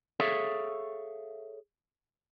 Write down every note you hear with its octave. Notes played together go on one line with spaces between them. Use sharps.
G#4 A4 C#5 E5 F5